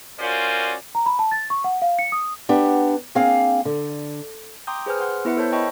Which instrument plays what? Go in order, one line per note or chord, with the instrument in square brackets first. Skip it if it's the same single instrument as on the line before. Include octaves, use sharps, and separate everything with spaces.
[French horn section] C#4 F4 F#4 A#4 C5 D5
[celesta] A#5
B5
A5
A6
C#6
F#5
F5
C#7
D#6
[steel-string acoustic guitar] B3 D4 G4
A#3 C4 D4 G#4 F5
D3
[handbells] G5 A#5 C6 D6 D#6 G6
G#4 B4 C5 G#5 F6
F#5 C6 F6
B3 E4 B4 E5 C#7
A4 A#4 C5 C#5 A5 G6
D#5 G5 A5 B5 C#6